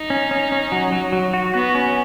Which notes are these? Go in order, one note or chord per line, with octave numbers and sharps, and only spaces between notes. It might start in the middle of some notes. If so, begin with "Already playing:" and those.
Already playing: D#4
C#4
C#4
C#4
F#3
F#3
F#3
F#4
B3 F#4
C#4